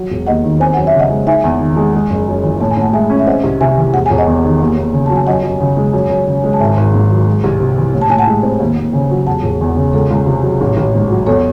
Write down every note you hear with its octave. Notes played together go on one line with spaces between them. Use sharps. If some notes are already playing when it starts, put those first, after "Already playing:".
Already playing: F#3
E1
D#2 D#5 F#5
D#3
C4 G#5
F#2 F#5
E5
C#3
D#5 F#5
G#3
D#4 E5 G#5
E2
D#3
G#3
G#3
F#1
F#2
E3
A2 A5
G#5
A2 F#5 A5
G#3 E5 G#5
C#4
E5
C4 D#5 F#5
C2
C3 E5 G#5
E3
E1 F#5
E1 G#5
D#5 F#5
E2
D#3
D#2
D#2
C#3
F#3 A5
G#5
F#2 D#5 F#5
F#2
C#3
G#3
F#2
F#2
C#3
G#3
A5
G#1 E5 G#5
G#1
G#2
F#3
G#3
C2
C3
E3
A2
A5
A2 G#5
F#5 A5
G#3
C4
D#2
D#2
C#3
F#3
E1 F#5 A5
E1
E2
C#3
C#2 A4 C#5
C#2
C3
F#3
A1
A1
G#2
F#3
E2 A4 C#5